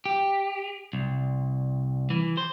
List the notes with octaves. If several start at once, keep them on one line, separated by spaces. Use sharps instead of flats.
G4
C2
E3
C5